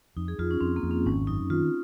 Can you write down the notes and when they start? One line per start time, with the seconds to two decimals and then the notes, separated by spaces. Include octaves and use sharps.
0.16 F2 D#4
0.28 G#4
0.39 F2 F4
0.51 C#4
0.61 F2 C4
0.76 A#3
0.83 F2
0.91 C4
1.06 G#1 C#4
1.27 F#2 D#4
1.50 D#3 F4